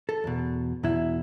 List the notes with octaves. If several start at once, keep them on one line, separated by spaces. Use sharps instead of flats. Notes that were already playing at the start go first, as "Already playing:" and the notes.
A4
E2 B2
E2 B2 E4